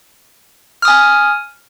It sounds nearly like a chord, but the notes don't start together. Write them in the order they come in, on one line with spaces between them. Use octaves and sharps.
F6 D#6 G#5